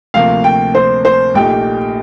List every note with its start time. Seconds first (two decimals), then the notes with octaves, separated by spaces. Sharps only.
0.14 D2 C3 F3 A#3 F5
0.44 G5
0.75 C5
1.05 C5
1.34 A#1 A#2 A3 D#4 G4 G5